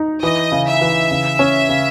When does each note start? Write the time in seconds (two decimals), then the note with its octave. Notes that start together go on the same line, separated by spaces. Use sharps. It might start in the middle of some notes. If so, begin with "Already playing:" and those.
Already playing: D#4
0.22 E3 D#5
0.52 C#3
0.66 E5
0.82 E3
1.11 C#3
1.39 C#4
1.69 C#3